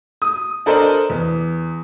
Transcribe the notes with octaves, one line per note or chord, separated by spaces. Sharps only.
D#6
D4 A4 A#4 C5 D5 D#5
E2